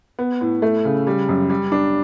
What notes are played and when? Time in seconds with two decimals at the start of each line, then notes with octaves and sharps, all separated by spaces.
0.19 B3
0.41 A2
0.62 A3
0.85 C#3
1.07 G3
1.29 F#2
1.50 G3
1.72 D4